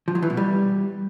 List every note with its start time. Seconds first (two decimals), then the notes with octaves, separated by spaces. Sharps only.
0.08 F3
0.15 F#3
0.22 E3
0.30 B2
0.37 G3